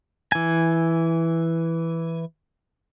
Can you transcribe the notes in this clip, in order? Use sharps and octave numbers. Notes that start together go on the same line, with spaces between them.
E3 G#5